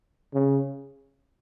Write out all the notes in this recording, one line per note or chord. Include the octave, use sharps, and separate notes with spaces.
C#3